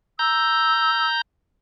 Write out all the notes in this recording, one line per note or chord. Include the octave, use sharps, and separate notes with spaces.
A#5 E6 G6